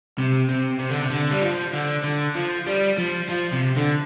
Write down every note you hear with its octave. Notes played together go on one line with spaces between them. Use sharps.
C3
C3
C3
D3
C3
D3
G3
F3
D3
D3
F3
G3
F3
F3
C3
D3